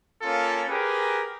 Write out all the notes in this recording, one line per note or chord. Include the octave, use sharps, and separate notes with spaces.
A#3 C#4 F4 A4
G4 G#4 A#4 B4